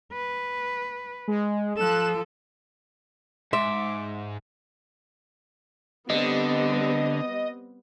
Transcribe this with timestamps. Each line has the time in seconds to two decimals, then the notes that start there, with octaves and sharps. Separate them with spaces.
0.13 B4
1.28 G#3
1.77 F3 A4 F#6 E7
3.53 G#2 E5 C6 D6
6.10 D3 G3 B3 C4 D#5